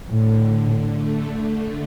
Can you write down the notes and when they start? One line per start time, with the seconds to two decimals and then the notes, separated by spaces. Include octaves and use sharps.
0.10 A2 D3
0.93 A3